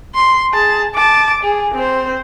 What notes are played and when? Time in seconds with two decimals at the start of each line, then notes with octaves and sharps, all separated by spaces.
0.15 C6
0.53 G#4 A5
0.95 A5 D6
1.44 G#4
1.74 C4 C5